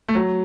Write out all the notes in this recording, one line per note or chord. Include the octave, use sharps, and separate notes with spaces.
A3
F#3